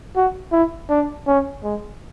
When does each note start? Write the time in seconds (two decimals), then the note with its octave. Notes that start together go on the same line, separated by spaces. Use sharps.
0.16 F#4
0.52 E4
0.89 D4
1.27 C#4
1.63 G#3